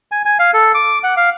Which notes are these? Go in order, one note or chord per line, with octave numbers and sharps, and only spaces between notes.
G#5
G#5
F5
A4
D6
F#5
F5